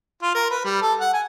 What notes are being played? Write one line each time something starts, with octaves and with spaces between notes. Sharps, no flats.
F4
A#4
B4
G3
A4
F#5
G#5